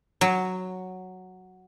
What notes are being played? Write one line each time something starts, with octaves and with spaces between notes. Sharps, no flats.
F#3